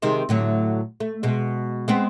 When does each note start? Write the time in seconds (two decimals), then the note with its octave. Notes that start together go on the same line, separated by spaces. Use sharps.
0.02 C3 D#3 G#3
0.29 A2 D3 F#3
1.00 A3
1.23 B2 G#3
1.88 G#3 B3 C4